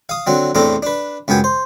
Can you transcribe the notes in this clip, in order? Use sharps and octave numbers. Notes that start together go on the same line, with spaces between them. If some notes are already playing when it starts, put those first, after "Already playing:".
F5 D#6
D3 F#3 C4
E2 A2 C4 D4 A4 A#5
D4 B4
C#2 F#2 B3 G5 G#5
C5